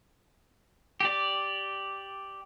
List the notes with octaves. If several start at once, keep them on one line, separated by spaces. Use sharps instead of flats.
G4 D5